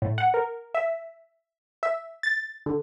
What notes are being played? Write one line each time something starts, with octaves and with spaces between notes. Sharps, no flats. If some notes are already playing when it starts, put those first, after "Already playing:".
A2
F#5
A#4
E5
E5
A6
D3